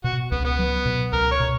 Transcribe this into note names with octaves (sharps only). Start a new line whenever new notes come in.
B2 F#4
C#2 B3
B3
F#3
B2
C#2 A#4
C#5
B2